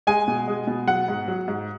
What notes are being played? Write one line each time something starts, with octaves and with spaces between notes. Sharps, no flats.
G#3 G#5
B2
G#3
B2
F#3 F#5
G#2
F#3
G#2